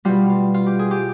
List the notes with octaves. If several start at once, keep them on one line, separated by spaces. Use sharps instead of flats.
B2 G3 F4
F4
F4
G4
G#4
G4